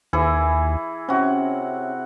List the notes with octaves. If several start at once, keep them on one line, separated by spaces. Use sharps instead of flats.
D#2 E3 E4 G#4
C3 C#4 F#4